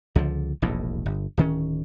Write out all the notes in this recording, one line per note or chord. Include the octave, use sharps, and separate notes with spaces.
C#2 D3 F3
E1 A#1 D#2 A2
G1
D1 D#3 C#4